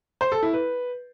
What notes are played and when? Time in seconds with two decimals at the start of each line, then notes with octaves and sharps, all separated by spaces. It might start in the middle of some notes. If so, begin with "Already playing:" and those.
0.21 C5
0.32 A4
0.43 E4
0.53 B4